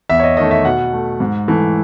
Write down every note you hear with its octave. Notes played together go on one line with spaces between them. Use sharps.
E2 E5
C#5
D#5
D#3 A3 D#5
E5
B2 F#5
A3
G#2
E3 A3